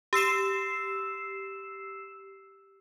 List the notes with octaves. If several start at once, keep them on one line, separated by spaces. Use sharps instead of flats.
G4 E6 C7 E7